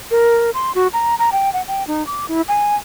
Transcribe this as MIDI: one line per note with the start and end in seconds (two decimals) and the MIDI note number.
0.11 0.50 70
0.54 0.72 84
0.75 0.88 66
0.93 1.15 82
1.19 1.30 82
1.32 1.52 79
1.53 1.62 78
1.68 1.86 79
1.87 2.05 63
2.07 2.26 86
2.28 2.42 64
2.48 2.76 80